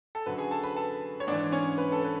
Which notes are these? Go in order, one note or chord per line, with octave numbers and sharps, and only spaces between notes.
A4
F#2 D3 F#3 B4
G#4 G#5
A4 A5
B4 B5
A4 A5
C#5
G#2 D4 D5
E3
C#4 C#5
B4
A4
B4